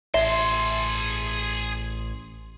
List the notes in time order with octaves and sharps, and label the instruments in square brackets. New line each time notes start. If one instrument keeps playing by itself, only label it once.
[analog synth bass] A1 [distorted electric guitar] G#4 A5 [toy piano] E5 [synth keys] C6